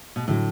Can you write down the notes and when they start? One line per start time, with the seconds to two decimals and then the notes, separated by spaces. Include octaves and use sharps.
0.16 B2
0.28 A2 D3 F#3